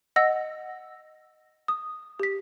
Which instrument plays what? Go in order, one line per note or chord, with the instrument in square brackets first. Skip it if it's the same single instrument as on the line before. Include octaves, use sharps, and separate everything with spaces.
[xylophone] D#5 F#5 E6 A#6
D#6
G4 B6